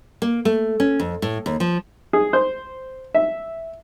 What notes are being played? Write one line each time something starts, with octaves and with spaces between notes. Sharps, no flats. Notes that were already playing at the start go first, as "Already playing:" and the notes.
A#3
A3
C#4
F2
A2
D#2
F3
G#4
C5
E5